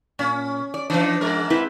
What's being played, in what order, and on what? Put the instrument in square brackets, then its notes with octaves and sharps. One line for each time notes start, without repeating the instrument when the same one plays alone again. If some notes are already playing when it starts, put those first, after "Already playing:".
[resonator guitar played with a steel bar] A#2 [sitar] C#4
[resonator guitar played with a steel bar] D5
[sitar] E3 D#4 [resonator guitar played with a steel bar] F3 D4
[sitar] G#2 G#3 A#4
[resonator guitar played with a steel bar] C4 E4 B4